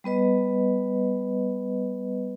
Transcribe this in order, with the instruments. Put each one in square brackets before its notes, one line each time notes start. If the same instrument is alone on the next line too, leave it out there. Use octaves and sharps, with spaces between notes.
[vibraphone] G3 B3 B4 D#5